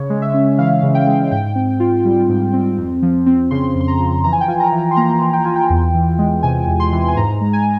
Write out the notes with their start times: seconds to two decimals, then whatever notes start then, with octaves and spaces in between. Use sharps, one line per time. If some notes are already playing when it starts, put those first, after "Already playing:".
Already playing: C#3 C#5
0.10 G#3
0.22 E5
0.34 C#4
0.58 E3 F5
0.83 C#3
0.95 G5
1.07 G#3
1.31 G#2 G5
1.55 C4
1.80 F4
2.04 G3
2.29 G#2
2.53 C4
2.78 F2
3.02 F3
3.26 C4
3.51 C#3 C6
3.75 F2
3.81 C6
3.88 A#5
4.00 F3
4.24 E3 A#5
4.32 G#5
4.41 G5
4.48 F4 G#5
4.60 A#5
4.72 E3
4.91 C6
4.96 A#3 A#5
5.21 E3
5.33 G5
5.44 F4 G#5
5.56 G5
5.70 E2
5.94 E3
6.18 G#3
6.43 C3 G#5
6.67 E2
6.80 C6
6.92 E3
7.08 G#5
7.16 G#2 A#5
7.41 G#3
7.53 G#5